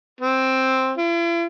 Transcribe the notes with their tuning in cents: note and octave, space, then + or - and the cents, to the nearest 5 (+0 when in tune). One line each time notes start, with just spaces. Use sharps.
C4 +5
E4 +45